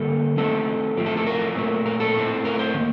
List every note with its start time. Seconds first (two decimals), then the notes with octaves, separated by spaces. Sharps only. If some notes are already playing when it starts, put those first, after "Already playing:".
Already playing: D3 G3 A#3 A4
0.37 D#3 A3 C4 A4
0.97 A2 F3 A3 C4
1.06 A4
1.17 A4
1.27 A#4
1.55 A#2 A3 C4
1.86 A#4
2.00 A4
2.15 A2 A3 C4
2.45 A#4
2.59 C5
2.74 D#3 A#3